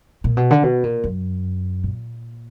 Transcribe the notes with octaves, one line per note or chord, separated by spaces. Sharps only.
A#2
B2
D3
B2
A#2
F#2
A#2